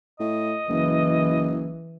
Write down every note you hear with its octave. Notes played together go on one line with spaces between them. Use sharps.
A2 D#5
F#1 E3